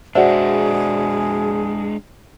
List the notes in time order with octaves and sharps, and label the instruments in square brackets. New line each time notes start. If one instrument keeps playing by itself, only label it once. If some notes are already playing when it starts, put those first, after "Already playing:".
[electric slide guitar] G#3 D4 [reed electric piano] F#4 E5 [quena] G#4 [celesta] C5 D5 F#5